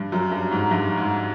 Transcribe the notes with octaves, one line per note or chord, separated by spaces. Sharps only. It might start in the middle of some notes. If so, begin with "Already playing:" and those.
Already playing: G2
F#2
G2
G#2
G2
G#2